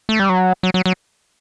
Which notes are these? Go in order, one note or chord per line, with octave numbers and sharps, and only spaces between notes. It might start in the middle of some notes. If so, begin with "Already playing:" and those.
A3
G3
F#3
F#3
F#3
F#3